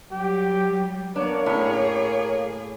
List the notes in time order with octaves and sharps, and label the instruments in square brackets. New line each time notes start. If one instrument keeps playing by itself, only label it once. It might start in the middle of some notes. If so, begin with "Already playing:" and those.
[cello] F#3 G3 [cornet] G4
[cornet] A#3 [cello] B3 [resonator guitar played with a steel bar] D4 [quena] C#5
[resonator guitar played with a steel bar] A2 C#4 [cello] G#4